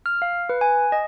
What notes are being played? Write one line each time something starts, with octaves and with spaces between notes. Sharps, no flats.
F6
F5
B4
G#5
D#5